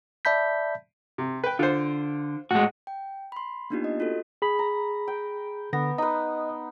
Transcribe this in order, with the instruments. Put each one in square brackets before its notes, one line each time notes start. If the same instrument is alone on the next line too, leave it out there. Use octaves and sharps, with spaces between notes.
[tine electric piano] D5 E5 A5 B5 G6 B6
[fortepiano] C3
B4 G5
[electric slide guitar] D3 [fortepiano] F4 C5
[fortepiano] A2 [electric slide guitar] G#3 F#4
[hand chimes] G5
B5 C6
A#3 B3 D4 D#4 F4 G4
D#5
F4 F#4 A4
[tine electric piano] G#4 B5
[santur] A#5
G5
[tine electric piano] D3 A#6 [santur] B3
[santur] D#4 B4 [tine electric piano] D#5